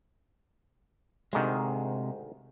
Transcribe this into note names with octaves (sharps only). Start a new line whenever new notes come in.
D2 G#2 C3 D#3 G#3